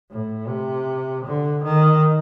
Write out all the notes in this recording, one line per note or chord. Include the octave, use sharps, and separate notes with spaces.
A2
C3
D3
D#3